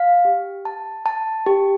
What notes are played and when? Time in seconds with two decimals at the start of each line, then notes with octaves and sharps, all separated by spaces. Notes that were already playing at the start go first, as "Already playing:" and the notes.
Already playing: F5
0.25 G4
0.65 A5
1.06 A5
1.46 G4